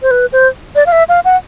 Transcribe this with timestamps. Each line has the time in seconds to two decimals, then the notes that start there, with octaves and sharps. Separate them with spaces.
0.02 C5
0.11 B4
0.32 C5
0.76 D5
0.86 F5
0.92 E5
1.09 F5
1.25 F#5